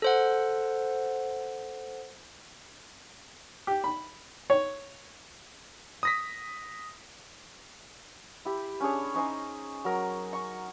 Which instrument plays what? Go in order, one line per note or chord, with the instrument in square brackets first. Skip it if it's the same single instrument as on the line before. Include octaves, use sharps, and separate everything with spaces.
[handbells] A4 C5 F#5
[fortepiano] G4
B5
C#5
[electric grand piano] D#6 A#6 B6
[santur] E4 G4
C#4 D4 G#4 C#5
C#4 D#4 C5 G#5
F#3 A#4
C#6